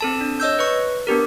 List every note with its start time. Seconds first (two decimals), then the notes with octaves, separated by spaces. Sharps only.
0.01 C4 A4 A5
0.21 D4
0.40 C#5 D#5 E6 G6
0.59 B4 C#6
1.07 B3 D4 G4 A#4